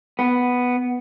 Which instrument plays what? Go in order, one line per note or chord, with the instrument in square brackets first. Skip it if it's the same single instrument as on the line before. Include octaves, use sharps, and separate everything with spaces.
[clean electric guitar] B3